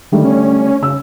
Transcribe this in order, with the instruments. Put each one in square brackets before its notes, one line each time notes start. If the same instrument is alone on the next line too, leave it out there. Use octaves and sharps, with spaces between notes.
[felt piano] D3 G3 A3 [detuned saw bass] D#3
[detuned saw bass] C#4
[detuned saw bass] C#3 [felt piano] E6